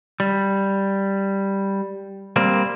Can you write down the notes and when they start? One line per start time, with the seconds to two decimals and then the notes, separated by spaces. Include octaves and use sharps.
0.20 G3
2.36 G3 A#3 C4